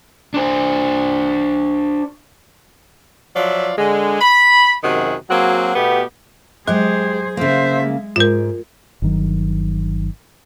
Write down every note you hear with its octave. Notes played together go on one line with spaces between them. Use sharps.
D4 C5
F3 F#3 F4 D5 E5
D3 G#3
B5
F#2 C3 D#3 F#4 G#4
F#3 A#3 C4 F#4 G#4
B2 A3 B3 G4
F#3 G#3 G4 G#4 C5
C#3 A#3 C5 E5
G#3
G#2 F4 A#4
G1 D#3 F#3